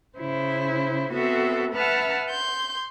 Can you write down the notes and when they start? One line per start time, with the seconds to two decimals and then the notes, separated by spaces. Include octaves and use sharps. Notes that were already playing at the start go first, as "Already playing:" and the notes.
0.19 C#3 E4 C5
1.13 B3 C4 F#4 A4 E5
1.74 B4 E5 F#5 A5 F6
2.30 C6 G6